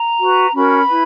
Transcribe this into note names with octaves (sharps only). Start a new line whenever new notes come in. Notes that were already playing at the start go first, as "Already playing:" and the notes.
Already playing: A#5
F#4 B4
C#4 F#4 A#4 B5
E4 B4